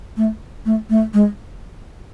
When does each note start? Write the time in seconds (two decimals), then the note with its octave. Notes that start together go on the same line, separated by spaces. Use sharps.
0.17 A3
0.66 A3
0.90 A3
1.14 G#3